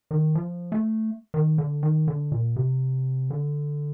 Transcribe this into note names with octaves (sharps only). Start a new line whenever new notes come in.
D#3
F3
A3
D#3
D3
D#3
D3
A#2
C3
D3